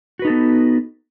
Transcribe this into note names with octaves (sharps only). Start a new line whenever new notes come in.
B3 D#4 F#4 A4 B4